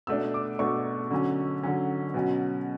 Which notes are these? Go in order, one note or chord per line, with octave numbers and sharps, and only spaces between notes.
B2 A3 D4 E6
D6
B2 A3 D4 C#6
D3 F#3 C#4
D3 F#3 C#4
B2 F#3 C#4